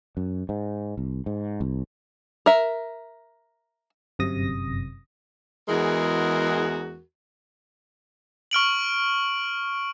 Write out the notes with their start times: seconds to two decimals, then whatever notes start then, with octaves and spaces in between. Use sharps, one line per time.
0.17 F#2
0.49 G#2
0.97 C2
1.26 G#2
1.61 C2
2.46 A#4 E5
4.19 G1 F#2 C3 D#6 A#6
5.69 E2 E3 G#3 F#4 G#4 A#4
8.51 C#6 F6 D7 F#7